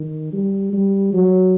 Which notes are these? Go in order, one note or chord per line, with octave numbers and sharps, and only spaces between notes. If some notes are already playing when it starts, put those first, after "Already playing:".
Already playing: D#3
G3
G3
F#3